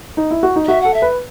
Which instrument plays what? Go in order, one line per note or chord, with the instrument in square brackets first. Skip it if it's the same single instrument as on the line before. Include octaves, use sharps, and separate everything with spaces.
[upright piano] D#4
E4
F#4
D#4
[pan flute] D#5
[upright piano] F#4 [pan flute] E5
[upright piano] A4 [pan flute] F#5
[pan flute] E5
[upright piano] B4